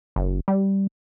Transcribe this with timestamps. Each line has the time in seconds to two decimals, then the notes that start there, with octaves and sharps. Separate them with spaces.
0.16 F#1
0.48 G3